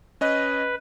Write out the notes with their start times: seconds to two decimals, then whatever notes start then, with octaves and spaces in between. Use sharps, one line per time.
0.21 C#4 B4 D#5